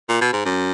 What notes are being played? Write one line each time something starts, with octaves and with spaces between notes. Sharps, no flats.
A#2
B2
G#2
F#2